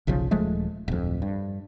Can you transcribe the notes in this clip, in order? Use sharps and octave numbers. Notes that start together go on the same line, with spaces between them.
F#1 B1 C#3 F3
D#1 F3 G#3 A3
D1 F2
G2